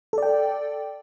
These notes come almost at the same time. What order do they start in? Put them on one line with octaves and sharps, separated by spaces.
A4 D5 G5